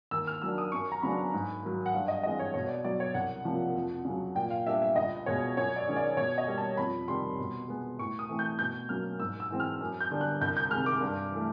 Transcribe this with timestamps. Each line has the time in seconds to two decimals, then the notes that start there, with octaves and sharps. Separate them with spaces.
0.11 D#2 E6
0.27 F6
0.42 D#3 F#3 A#3 D4 E6
0.58 D#6
0.72 F#2 C#6
0.92 A#5
1.02 C#3 F#3 B3 D4 B5
1.33 G#2
1.63 D#3 F#3
1.86 F#5
1.93 G2 F5
2.08 D#5
2.23 E3 G#3 C4 D#5
2.39 C#5
2.54 B2 C#5
2.64 C#5
2.69 D5
2.84 F#3 B3 D5
3.00 C#5
3.14 C2 F#5
3.45 C3 F3 A#3
3.75 F2
4.05 C#3 F#3
4.35 A#2 G5
4.50 F5
4.66 G3 B3 D4 E5
4.82 E5
4.96 C#2 D#5
5.26 B2 G#3 C#5
5.57 F#2 C#5
5.76 D5
5.87 D#3 G#3 C#4
5.96 D5
6.17 B2 C#5
6.38 D#5
6.48 G3 A#3
6.58 A5
6.77 F2 B5
7.08 C3 D#3 G3 C6
7.39 B2
7.68 G#3 B3
7.98 A2 C#6
8.19 D#6
8.29 E3 A3 C4
8.39 G6
8.59 B2 G6
8.89 F#3 A#3 C#4 F6
9.20 G#2 E6
9.40 E6
9.51 E3 G#3 C4
9.60 F6
9.80 F#2
10.01 G6
10.11 D3 G3 B3 D4
10.21 F#6
10.41 C2 G6
10.57 G6
10.71 C3 D#3 G#3 F6
10.86 D6
11.01 G2
11.32 E3 A3